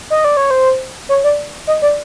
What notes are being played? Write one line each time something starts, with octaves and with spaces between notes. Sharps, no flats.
D#5
D5
C#5
C5
C#5
D5
D#5
D5